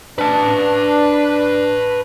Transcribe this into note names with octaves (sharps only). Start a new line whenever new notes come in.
D4 B4 A5